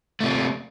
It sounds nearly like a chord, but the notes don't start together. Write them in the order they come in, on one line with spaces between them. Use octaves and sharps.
A3 C3 A#3